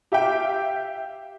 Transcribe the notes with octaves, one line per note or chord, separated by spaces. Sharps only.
G4 E5 F5 G5